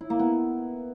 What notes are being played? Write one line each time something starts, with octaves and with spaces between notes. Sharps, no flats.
E4
A#3
B3